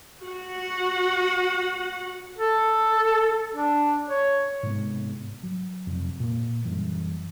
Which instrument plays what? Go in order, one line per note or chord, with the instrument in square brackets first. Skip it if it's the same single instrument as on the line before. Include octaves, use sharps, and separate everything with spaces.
[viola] F#4 F#5
[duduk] A4
D4
C#5
[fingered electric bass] G#2 C3 B3
F#3
F2 C3
A#2 A#3
F#2 E3 G3